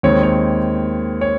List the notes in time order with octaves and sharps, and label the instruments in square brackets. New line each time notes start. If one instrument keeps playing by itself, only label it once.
[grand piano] D#2 D#3 G#3 C4 C#5
C#5
C#5